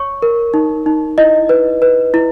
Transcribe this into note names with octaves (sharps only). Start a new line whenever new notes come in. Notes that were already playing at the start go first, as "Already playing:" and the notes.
Already playing: C#5 C#6
A#4
D#4
D#4
E4 D#5
B4
B4
E4